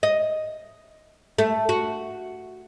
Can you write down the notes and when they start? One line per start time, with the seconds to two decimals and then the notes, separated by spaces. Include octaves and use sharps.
0.03 D#5
1.38 A3
1.69 F#4